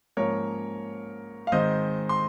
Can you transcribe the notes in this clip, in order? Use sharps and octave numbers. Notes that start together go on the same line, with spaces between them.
G#2 F3 A#3 C#4 A#4 C#5
F5
G#2 D#3 G#3 C4 C5 D#5
C6